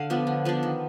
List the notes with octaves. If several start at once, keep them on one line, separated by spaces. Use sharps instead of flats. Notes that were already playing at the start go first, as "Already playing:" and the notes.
Already playing: D3 F5
F3 B3 D4
D3
F3 B3 D4
D#3